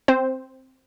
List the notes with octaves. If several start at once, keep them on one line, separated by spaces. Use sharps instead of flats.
C4 C5